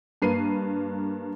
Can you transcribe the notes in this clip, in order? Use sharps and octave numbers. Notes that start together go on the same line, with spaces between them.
G2 A#3 B4 C7 D#7